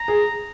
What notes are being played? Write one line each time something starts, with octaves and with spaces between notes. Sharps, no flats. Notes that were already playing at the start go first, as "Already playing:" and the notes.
Already playing: A#5
G#4